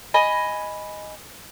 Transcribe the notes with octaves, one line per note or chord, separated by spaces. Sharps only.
D#5 G#5 B5